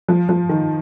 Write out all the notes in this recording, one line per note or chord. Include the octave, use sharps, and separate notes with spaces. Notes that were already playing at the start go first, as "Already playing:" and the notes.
F3
F3
D#3